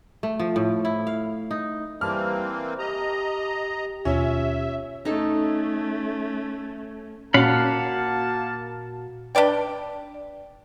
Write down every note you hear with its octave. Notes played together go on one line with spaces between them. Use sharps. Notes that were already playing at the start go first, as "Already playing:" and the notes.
A3
F3
A2
E4
F5
D#4
E3 G3 A#3 C4 A5 B5 D6 F6
G4 D#5 A#5
D#2 B2 C#4 F4 E5
A3 C#4 D#4 A4
A#2 A#3 C#4 F#4 F5 F#5 A5 B5
D4 B4 D5 G5